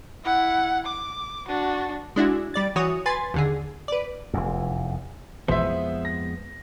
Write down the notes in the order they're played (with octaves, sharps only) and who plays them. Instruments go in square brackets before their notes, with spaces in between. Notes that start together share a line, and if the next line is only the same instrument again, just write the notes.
[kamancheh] E4 F#5
D6
D4 F#4
[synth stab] G#3 D4 E4 F#4
G3 D5 A6
E3 F#4 C#5 D#6
B4 G#5 C6 A6
D#2 D3 G#4
B4 D5
[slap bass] F1 E2
[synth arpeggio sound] A1 B2 E3 [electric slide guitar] F2 G#3 B3 [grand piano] C5 E5
[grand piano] A#6